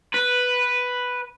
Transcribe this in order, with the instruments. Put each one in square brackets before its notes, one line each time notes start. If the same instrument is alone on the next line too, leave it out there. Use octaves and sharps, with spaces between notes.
[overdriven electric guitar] B4